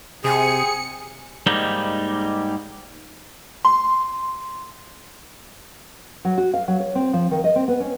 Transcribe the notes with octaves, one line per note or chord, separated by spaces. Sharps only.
C3 C4 G#4 G#5 C#7
G#2 G3 A#3 D#4 G4
C6
F#3
F#4
F5
F#3
C#5
C4
F3
D#3
D#5
C4
B3
C#4